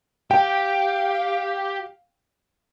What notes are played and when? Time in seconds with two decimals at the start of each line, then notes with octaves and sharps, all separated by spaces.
0.31 G4 F5 G5